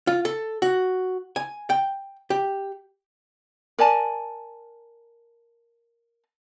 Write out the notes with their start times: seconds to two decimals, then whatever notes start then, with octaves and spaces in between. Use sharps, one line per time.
0.07 F4
0.25 A4
0.62 F#4
1.36 G#5
1.70 G5
2.30 G4
3.79 A#4 D5 G#5 A5